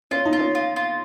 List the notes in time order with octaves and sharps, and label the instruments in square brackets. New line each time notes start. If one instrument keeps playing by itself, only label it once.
[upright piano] C#4 [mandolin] F4
[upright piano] D#4
[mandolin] F4
[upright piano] C#4
[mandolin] F4
F4